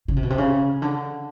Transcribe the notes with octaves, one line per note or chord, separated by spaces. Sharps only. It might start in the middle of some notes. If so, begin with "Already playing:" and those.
C#3
C3
B2
C3
C#3
D3